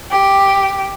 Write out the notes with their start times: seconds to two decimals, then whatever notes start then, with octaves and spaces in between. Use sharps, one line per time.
0.10 G4